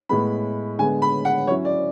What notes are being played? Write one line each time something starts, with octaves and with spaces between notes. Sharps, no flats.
A2 G#3 B3 B5
D3 G#3 B3 G#5
B5
F#5
F#3 C#4 E4 C#5
D5